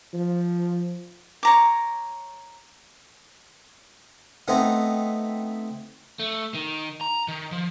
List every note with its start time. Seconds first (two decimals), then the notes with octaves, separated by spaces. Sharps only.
0.14 F3
1.43 C#5 A#5 D6
4.48 A3 B3 C4 D#4
6.19 A3
6.54 D#3
7.01 A#5
7.28 D#3
7.52 F3